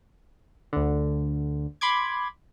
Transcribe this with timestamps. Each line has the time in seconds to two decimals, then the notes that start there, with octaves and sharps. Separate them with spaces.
0.73 D2 D3
1.81 B5 C6 D6 G#6